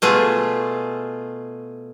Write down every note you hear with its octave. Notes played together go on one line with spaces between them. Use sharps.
B2 A3 F4 G#4